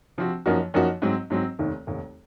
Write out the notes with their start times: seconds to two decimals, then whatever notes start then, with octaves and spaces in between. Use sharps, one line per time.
0.18 C3 F3 C4 F#4
0.46 F#2 F3 A#3 D#4 F#4
0.74 F#2 F3 A#3 D#4 F#4
1.02 G#2 F#3 C4
1.30 G#2 F#3 C4
1.59 F1 D#2 D#3
1.87 F1 D#2 D#3